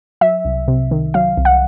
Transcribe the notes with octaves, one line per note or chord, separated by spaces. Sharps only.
F#3 E5
C2
C3
D#3
F#3 F5
C2
F#5